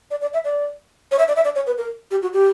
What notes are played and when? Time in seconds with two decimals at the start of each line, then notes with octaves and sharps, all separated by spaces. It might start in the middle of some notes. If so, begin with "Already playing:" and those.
0.11 D5
0.22 D5
0.34 E5
0.45 D5
1.11 C#5
1.19 E5
1.28 D5
1.36 E5
1.44 D5
1.55 C#5
1.67 B4
1.78 A#4
2.11 G4
2.22 F#4
2.33 G4